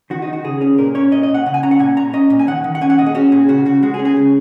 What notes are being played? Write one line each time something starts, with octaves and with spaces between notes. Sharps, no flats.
D#3 F#4
D#4
D#3
F#4
C#3 G#4
C#4 G#4
A#2 A#4
C#4 C#5
A#2 D#5
D#5
A#2
F#5
C#3 F#5
G#5
C#4 A#5
F#5
A#2 G#5
A#2 A#5
C#4 D#5
A#2
G#5
D#3 F#5
D#3
F#5
C#4 G#5
F#5
A#2 D#5
G#4
C#4 F#4
A#2 G#4
C#3 F#4
C#3 F#4
G#3 F#4
G#4
C#4
G#4
C#3